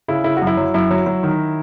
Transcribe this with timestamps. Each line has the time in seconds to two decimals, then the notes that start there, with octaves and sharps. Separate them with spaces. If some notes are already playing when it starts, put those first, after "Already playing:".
0.08 C#3 E4
0.24 C#3 E4
0.37 F#4
0.42 F#2
0.47 E4
0.57 F#3
0.74 F#2 E4
0.91 F#3
1.06 F#3
1.23 D#3